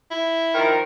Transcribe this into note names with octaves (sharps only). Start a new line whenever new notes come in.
E4
D#3 F3 A#4